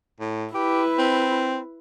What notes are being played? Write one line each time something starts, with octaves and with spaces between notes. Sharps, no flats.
A2
E4 G4 B4
C4